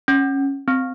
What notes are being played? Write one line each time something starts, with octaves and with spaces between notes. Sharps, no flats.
C#4
C4